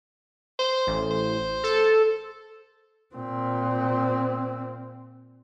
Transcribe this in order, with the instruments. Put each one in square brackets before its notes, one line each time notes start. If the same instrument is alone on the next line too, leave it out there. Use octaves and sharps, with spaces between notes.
[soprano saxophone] C5
[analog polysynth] A1
[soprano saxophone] C5
[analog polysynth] A4
[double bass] A#2 C4